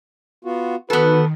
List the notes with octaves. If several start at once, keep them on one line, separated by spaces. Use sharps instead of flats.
B3 F4 F#4
D#3 B3 F#4 A4 B4